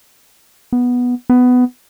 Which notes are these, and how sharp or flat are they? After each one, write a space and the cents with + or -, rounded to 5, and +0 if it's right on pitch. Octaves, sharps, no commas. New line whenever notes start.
B3 -5
B3 +15